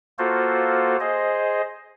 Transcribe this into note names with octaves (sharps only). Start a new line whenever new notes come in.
A#3 F4 F#4 A4 C5
G#4 C5 D#5